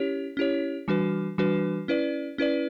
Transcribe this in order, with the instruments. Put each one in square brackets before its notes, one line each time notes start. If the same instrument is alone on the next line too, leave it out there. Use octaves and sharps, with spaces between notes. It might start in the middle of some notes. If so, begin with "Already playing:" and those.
Already playing: [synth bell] C#4 E4 G4 C#5
C#4 E4 G4 C#5
E3 G3 D4 F#4 B4
E3 G3 D4 F#4 B4
C#4 E4 B4 D5
C#4 E4 B4 D5